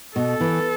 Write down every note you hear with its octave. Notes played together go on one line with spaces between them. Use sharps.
B2 A4
E3